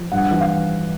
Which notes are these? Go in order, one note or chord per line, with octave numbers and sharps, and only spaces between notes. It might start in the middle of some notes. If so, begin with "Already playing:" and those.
Already playing: F3
G2 F#5
E3
F5